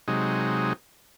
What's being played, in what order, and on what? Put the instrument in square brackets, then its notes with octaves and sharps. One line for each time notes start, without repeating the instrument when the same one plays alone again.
[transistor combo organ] C3 F#3 G#3 D#4